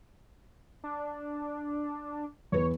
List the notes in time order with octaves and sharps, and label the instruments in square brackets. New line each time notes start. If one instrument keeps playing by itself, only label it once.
[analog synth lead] D4
[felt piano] E2 B4 [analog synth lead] C#5